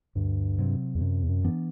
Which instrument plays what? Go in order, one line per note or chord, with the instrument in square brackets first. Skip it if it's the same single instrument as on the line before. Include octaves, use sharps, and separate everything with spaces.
[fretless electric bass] D2 [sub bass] G2
[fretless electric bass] C3 F#3 C4
[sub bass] E2
[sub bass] F#2 [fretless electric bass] C3
[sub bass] E2
F#2
[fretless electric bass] E3 B3 D4